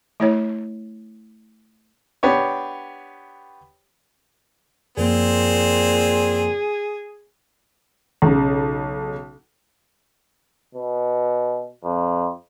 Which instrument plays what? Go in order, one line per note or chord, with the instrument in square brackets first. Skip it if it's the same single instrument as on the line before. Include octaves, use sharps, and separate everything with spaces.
[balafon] A3 E4 C#5
[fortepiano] B3 D4 G4 C#5
[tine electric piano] F#2 F3 A#3 [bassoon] A#2 [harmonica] C4 [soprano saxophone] G#4
[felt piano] B1 C#3
[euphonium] B2
F2